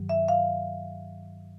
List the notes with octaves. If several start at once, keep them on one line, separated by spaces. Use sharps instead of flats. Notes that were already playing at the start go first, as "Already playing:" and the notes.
Already playing: G2 D#3 F#3
E5
F5